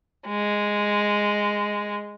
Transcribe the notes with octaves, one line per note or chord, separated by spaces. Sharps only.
G#3